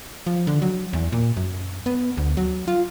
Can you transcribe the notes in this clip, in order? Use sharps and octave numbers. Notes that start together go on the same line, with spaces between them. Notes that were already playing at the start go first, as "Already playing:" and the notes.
F3
D3
F#3
E2
A#2
F#2
B3
D2
F#3
F4